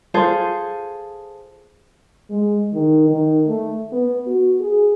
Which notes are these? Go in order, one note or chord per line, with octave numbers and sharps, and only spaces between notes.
F4 G#4 A4 C5
G#3
D#3
D#3
A3
B3
F#4
G#4